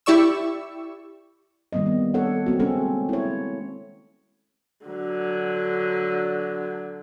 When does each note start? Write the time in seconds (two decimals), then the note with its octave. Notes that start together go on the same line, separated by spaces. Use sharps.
0.06 E4 G4 D5 C#6 E6
1.73 D#3 G3 A#3 C4 D#5
1.86 B3
2.14 D4 A4 C#5 F#5
2.46 A#3 C4 F#4
2.59 G#3 C4 C#4 A4
3.09 E4 C#5
4.86 D3 F#3